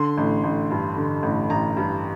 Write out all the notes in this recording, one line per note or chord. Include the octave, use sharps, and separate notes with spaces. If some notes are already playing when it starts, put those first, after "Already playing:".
Already playing: D3 C6
A1
A1
G2
D3
A1
A1 A#5
G2